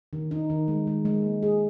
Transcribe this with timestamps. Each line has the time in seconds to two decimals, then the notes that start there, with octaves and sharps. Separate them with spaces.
0.13 D#3
0.31 D#4
0.50 D#3
0.68 G#3
0.87 G#3
1.05 G#3
1.24 A#3
1.43 G#4